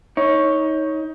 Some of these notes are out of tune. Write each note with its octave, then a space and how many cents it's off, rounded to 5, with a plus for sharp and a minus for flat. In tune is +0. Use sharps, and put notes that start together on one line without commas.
D#4 +25 C#5 +0